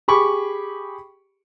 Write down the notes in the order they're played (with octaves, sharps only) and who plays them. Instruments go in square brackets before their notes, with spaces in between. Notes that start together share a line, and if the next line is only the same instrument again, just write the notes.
[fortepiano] G4 G#4 B5 C#6 D6